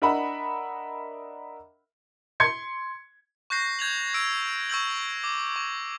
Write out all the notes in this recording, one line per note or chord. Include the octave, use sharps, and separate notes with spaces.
D4 A#4 D#5 E5 F#5 B5
C6 G#6 C#7
C#6 F#6 G6 A#6 C7
G6 G#6 F7 F#7
E6 D7
C#6 E6 G6 F#7
D6
C#6